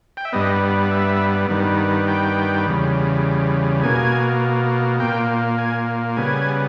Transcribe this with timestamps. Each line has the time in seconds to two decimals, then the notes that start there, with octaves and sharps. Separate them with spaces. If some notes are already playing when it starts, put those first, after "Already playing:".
0.17 G5
0.25 E5
0.33 G2 G3 B3 D#5
0.91 E5
1.50 G2 D#3 G3 B3
2.08 G5
2.66 E2 C#3 G3
3.83 B2 A#3 G#5
5.00 A#2 A#3 G5
5.58 G#5
6.17 C#3 G3 B3 G#5